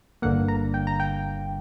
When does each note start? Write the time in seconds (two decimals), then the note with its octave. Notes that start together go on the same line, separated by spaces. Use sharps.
0.22 G1 G2 D3 A#3 F#5
0.48 A#5
0.74 G5
0.87 A#5
1.00 G5